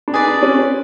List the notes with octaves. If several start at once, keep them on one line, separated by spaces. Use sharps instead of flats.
D4
D#4 G#4 B4 D5
D4
C#4
C4
C#4